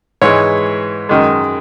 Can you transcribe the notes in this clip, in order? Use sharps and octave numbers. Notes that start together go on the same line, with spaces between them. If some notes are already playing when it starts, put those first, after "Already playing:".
G#2 E3 G#3 C#5
F#2 D#3 G#3